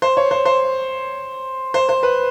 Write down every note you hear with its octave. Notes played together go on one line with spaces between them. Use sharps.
C5
C#5
C5
C5
C5
C5
B4